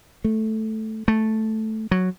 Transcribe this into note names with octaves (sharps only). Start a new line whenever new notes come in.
A3
A3
F#3